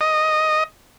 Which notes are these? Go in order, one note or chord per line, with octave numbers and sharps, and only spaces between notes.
D#5